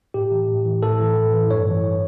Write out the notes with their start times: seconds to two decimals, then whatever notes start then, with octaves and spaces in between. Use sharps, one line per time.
0.14 A2 G4
0.31 E3
0.49 A2
0.66 E3
0.83 A2 A4
1.00 E3
1.16 A2
1.34 E3
1.51 G2 C#5
1.67 E3